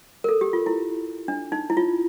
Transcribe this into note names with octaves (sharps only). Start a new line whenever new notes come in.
A#4
A4
G4
F4
E4
D4
D#4
E4
F4